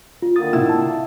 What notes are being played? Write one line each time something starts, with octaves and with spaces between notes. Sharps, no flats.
F4
D3 D#3 A#3 D#6 A6
A2 C3 D#4 E4
A5